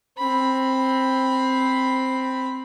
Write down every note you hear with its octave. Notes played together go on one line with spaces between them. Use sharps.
C4 B5